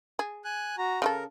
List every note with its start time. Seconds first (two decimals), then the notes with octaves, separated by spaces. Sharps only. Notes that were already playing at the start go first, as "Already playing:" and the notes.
0.19 G#4
0.45 G#5 F#6
0.78 F#4 A#5
1.02 C#3 F4 A4 A#4